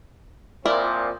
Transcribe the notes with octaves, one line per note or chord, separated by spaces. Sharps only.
A#2 F3 C4 E4 A#4 D5